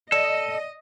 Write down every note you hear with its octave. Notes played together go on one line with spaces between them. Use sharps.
A4 D5 D#5